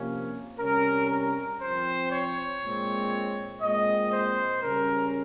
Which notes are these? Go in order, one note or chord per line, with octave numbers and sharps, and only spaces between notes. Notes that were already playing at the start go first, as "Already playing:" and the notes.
Already playing: C3 F3 A#3 C#4
C3 G3 C#4 A#4
A#4
F3 C4 C5
C#5
A#2 G#3 C4
A#2 G#3 C4 D#5
C5
C#3 G3 C#4 A#4